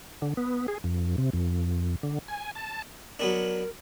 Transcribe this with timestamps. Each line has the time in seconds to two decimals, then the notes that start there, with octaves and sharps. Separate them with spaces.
0.22 D3
0.37 B3
0.68 G#4
0.84 F2
1.18 C3
1.33 F2
2.03 D3
2.28 G#5
2.55 A5
3.19 F#3 B3 D4 A#4